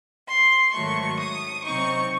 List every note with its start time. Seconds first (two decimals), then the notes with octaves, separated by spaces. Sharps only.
0.28 C6
0.73 G#2 D#3 F#3 A3 C#6
1.19 D#6
1.64 C3 F#3 C4 D#4 C#6